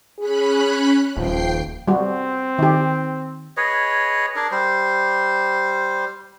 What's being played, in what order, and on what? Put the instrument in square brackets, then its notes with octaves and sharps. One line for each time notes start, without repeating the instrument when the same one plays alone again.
[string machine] C#4 B5 F#6 [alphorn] G#4
[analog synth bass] D#1 [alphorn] F3 [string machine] G5 C7
[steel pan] G3 F#4 [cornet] C4
[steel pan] D#3 G4
[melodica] G#4 B4 C#5 D#5
D4 G#4 A#4
G3 C5